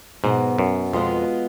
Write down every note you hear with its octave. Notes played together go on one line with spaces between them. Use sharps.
G#2 B2 F#3 B3
F#2
F2 B2 G#3 B3 F4